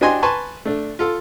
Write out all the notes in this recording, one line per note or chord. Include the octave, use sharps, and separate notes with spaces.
D4 F#4 G4 D#5 G#5 C6
B4 G#5 A5 C6 C#6
A3 D4
F4 A4